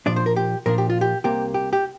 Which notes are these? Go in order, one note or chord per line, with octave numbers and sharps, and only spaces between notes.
A#2 F3 D4 D5
C5
A#4
G4
A#2 F3 A#3 D4 A#4
G4
F4
G4
C2 C3 A#3 G4
G4
G4